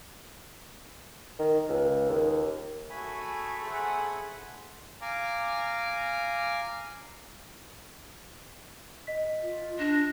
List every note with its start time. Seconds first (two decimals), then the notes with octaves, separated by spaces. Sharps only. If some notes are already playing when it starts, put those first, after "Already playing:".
1.39 D#3
1.69 C#2
2.09 D#2
2.90 A3 F#4 G#4 G#5 B5
3.64 G#4 C5 F#5
5.01 F5 G#5 A#5 D6
9.07 D#5 B6
9.43 F4
9.79 D4 A#6